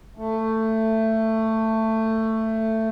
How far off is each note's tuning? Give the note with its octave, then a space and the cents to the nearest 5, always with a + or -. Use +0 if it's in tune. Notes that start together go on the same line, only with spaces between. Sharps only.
A3 +15